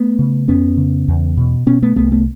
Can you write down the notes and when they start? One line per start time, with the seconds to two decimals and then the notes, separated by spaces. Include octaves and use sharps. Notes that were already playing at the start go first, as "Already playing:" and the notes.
Already playing: A3 B3
0.19 C#3
0.48 F2 B3 C#4
0.77 C#3
1.08 E2
1.37 B2
1.66 B2 B3 C#4
1.82 A3 B3
1.96 C2 A3 B3
2.12 A3 B3